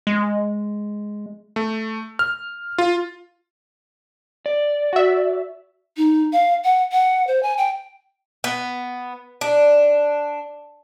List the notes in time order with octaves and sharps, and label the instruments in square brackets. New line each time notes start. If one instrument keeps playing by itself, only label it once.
[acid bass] G#3
[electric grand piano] A3
F6
F4
[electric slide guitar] D5
[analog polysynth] F#4 E5
[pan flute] D#4
F5
F#5
F#5
C5
G#5
G5
[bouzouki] B3
D4